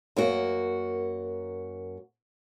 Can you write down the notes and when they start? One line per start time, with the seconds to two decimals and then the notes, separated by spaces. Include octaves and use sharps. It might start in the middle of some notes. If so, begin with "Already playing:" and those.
0.16 F#2 A#3 F#4